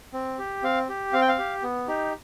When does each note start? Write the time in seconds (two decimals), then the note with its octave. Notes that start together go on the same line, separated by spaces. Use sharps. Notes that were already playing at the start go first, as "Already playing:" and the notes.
0.13 C4
0.38 G4
0.63 C4 F5
0.89 G4
1.13 C4 F5
1.21 G5
1.28 F5
1.38 G4
1.63 B3
1.88 D#4 G4